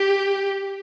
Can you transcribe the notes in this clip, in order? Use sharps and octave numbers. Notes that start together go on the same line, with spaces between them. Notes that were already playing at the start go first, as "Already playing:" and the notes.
Already playing: G4